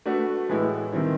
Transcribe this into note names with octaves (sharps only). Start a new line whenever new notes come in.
A3 D4 F#4 B4
A2 E3 G#3 B3 E4
D#3 G3 C4 E4